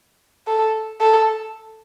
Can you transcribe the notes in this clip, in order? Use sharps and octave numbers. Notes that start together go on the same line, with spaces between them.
A4
A4